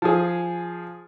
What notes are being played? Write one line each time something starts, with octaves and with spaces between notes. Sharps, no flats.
F3 G#4